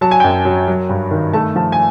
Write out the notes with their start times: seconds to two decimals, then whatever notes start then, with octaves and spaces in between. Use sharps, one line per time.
0.01 F#3 A5
0.11 G#5
0.20 F#2 G5
0.30 G#5
0.45 F#3
0.68 F#3
0.89 G2
1.11 D#3
1.33 A3 A5
1.56 F3 A5
1.72 G#5